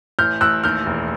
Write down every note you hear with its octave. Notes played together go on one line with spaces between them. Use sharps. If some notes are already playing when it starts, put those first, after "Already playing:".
A1 F6 G6
A1 E6 F#6
D#2 F6 G6
E1